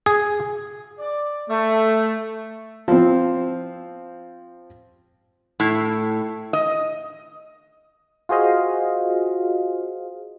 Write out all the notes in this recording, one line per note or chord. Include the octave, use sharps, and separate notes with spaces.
G#4
D5
A3
F3 C4
A2
D#5
F4 F#4 G#4 C5 D#5 F5